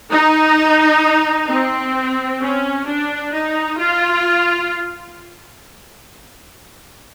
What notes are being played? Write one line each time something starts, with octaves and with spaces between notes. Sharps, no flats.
D#4
C4
C#4
D4
D#4
F4